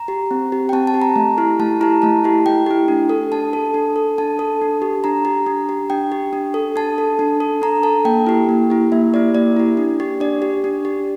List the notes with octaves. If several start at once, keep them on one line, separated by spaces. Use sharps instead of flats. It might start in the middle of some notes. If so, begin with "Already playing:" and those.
Already playing: A#5
G4
C4
G4
G5
C4 A5
A5
G4
A#5
A3
E4 G4
A3 A5
E4 G4 A#5
A3 A5
E4 G4
A3 G5
E4 G4
D4
A4
D4 A5
A4
D4
A4
D4 A5
A4
D4
G4
D4 A#5
G4
D4
G4
D4 G5
G4
D4
A4
D4 A5
A4
D4
A4
D4 A#5
A4 A5
A#3 G5
E4 G4
A#3
E4 G4
A#3 E5
E4 G4 D5
A#3 D5
E4 G4
D4
G4
D4 D5
G4
D4
G4